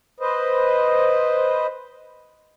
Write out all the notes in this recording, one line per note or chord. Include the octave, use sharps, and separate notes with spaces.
B4 C5 D#5